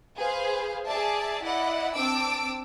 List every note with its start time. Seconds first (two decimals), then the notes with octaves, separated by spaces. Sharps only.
0.18 G#4 B4 C5 F5
0.86 G#4 D5 E5 A5
1.43 E4 D5 D#5 F#5
1.94 C4 D4 A5 D6 E6 D7